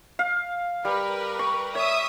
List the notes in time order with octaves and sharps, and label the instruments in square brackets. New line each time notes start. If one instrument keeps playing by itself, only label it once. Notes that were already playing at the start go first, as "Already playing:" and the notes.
[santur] F5
[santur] G3 [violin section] A#4 B4
[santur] C#6
[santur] C#5 [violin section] E5 D#6